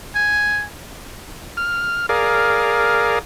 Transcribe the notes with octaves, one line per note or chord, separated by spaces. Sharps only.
G#5
F6
G#4 A#4 D5 F5